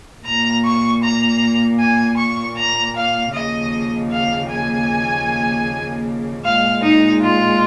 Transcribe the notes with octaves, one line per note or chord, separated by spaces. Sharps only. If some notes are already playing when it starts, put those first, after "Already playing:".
A#2 A#3 A#5
C#6
A#5
G#5
C#6
A#5
F5
D#2 C#3 F3 A#3 D#5
F5
G#5
A#2 G#3 F5
D#4
F4